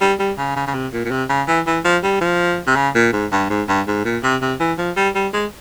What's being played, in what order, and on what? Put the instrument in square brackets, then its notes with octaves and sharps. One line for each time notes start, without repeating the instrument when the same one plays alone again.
[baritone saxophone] G3
G3
C#3
C#3
C#3
C3
A#2
A#2
C3
C#3
E3
E3
F3
G3
F3
C3
C#3
A#2
G#2
G2
G#2
G2
G#2
A#2
C3
C3
E3
F3
G3
G3
G#3